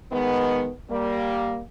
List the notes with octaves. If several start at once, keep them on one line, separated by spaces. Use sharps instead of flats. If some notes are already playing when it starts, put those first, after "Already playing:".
D#3 G#3 B3
G3 A#3